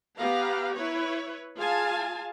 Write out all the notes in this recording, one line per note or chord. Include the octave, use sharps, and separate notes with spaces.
B3 G4 B4 F5 A#5
E4 B4 C#5
F4 G#4 F5 G#5 A5